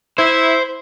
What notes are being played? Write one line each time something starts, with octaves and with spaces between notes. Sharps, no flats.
E4 C5